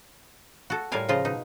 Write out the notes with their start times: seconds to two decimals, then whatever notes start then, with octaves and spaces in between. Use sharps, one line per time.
0.70 F#4 A4
0.92 A2 G3 F4 A#4 F5 G#5
1.09 C#3 F3 F4 D#5
1.25 B2 D#4